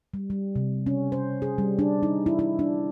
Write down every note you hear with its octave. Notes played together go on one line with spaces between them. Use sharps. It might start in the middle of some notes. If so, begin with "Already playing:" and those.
G3
G3
C3
C#4
C5
G#4
G3
D4
D#4
E4
E4
D4